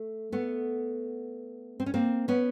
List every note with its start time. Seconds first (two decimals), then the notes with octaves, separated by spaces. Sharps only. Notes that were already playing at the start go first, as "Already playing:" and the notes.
Already playing: A3
0.32 A3 B3
1.80 C4
1.86 C#4
1.94 A#3 C4
2.28 B3 C#4